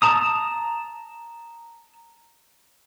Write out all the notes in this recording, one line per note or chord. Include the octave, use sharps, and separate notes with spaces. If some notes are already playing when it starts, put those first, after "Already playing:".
A5 A#5 D#6